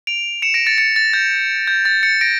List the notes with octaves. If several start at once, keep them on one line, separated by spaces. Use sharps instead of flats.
D7 F7
C#7 E7
A#6 D7
A6 C#7
A6 C#7
A6
G6
G6
A6
A6 C#7
A#6 D7